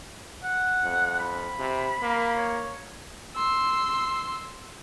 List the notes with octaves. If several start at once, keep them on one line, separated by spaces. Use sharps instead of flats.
F#5
F2
B5
C3
A#3
C#5
C6 E6